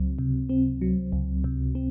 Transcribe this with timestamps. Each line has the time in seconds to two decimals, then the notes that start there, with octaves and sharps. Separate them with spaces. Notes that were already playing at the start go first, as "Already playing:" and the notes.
Already playing: C#2 F#3 C4
0.19 C3
0.49 C4
0.82 F#3
1.13 C#2
1.44 C3
1.75 C4